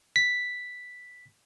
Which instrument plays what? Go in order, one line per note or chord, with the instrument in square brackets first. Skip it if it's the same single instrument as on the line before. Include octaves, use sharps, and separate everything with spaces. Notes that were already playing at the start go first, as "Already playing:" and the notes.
[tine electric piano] B6